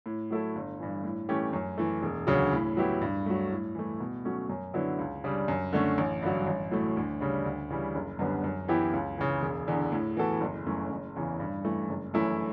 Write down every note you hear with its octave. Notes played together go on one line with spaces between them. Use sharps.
A2
F#3 A3 E4 A4
G1
G2 E3
A2
E3 A3 C#4 G4
F#2
E3 A3
E1
D2 C#3 F#3
A2
F#3 B3 E4 G4
G2
F#3 A3
A2
E3 A3
B2
F#3 A3 C#4
F#2
D3 F#3 B3 E4
C#2
C#3 G3 D4
F#2
D3 A3 C#4
A1
G2 D3 F#3
A1
A2 F#3 A3
D2
C#3 G3 D4
D2
C#3 E3 G3
F#1
F#2 D3 G3 B3
F#2
E3 B3 E4 G4
C#2
C#3 E3
E1
E2 D3
A2
E3 B3 F#4 A4
F#1
F#2 E3 A3 C#4
F#1
E2 C#3 E3
G2
E3 A3
F#1
F#2 E3 A3 E4